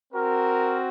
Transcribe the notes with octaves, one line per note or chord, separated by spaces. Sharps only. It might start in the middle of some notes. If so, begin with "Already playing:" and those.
C4 F#4 A#4